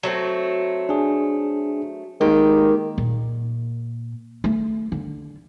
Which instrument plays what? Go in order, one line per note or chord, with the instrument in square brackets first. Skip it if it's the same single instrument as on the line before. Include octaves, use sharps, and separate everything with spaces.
[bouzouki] F#3 A3 C4
[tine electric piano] D4 G#4
[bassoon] D#3 [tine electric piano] G#3 A#3 [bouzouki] G4
[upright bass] A#2
A3
D3